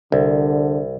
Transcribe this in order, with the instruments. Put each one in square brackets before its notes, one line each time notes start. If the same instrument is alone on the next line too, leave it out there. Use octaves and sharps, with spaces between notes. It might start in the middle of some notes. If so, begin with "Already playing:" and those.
[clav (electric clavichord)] C2 [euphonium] D3